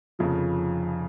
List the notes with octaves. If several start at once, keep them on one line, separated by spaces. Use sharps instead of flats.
F1 F2 C#3 F3